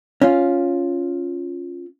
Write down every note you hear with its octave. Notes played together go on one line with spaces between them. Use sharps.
C#4 F4